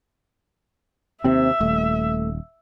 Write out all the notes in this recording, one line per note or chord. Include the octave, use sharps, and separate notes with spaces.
D#2 C3 C4 E5
D#1 A3